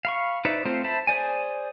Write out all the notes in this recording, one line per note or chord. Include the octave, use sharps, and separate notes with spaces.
F5 B5 C#6
D#4 B4 C5 D5 E5
A3 C4 F4 A4 C5
C5 E5 A5 B5
G#4 C5 D5 G#5